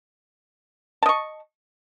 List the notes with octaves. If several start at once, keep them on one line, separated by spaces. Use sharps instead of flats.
D#5 A5 C#6